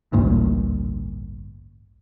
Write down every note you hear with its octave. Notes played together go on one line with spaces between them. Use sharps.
A1 D2 G2 A#2